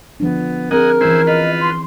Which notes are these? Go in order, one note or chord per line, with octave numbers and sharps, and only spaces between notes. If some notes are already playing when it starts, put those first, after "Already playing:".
D3 F3 B3 D4
C4 G#4 A#4 D#5 F#5 G#5
E3 C#4 E4 C5 G#5
F4 B4 D#5
C6